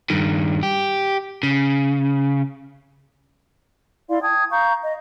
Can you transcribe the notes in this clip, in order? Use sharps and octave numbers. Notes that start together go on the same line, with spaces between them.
G2 D#3
G4
C#3
E4 D5 F5 C6
G5 A5 D#6 G#6
F5 A#5 C#6 G6
D#5